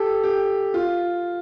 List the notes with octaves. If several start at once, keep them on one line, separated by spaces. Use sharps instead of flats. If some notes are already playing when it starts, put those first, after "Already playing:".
Already playing: G4 A4
G4
F4